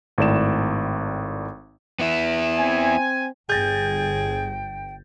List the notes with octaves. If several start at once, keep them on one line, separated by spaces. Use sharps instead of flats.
G#1 A2 D5 E7
B3 E4
C4 G#5
G1 G#4 G5 G6 A6 A#6